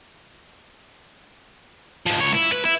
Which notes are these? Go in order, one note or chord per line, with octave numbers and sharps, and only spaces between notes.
G#2 F3
C#2 C#5
E4
B4
E4